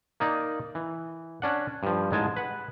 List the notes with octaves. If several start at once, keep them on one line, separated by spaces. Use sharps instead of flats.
A#3 D#4 D5
E3
C#4 D4 F#5
G2 F3
A1 G#2 G#3 G#5 A5
B4 F#5